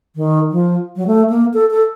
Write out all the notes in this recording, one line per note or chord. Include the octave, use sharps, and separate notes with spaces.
D#3
F3
F#3
A3
A#3
A4
A4